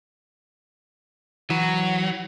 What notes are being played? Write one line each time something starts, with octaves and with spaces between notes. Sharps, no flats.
E3 F#3